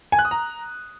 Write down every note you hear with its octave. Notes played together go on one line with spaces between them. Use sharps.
G#5
F#6
D#6
A#5